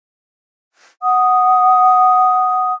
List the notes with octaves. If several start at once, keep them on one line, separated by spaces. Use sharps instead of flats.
F#5 D#6